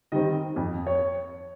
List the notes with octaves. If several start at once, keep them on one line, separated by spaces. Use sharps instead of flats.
D#3 G3 C4 D#5
F2
C#5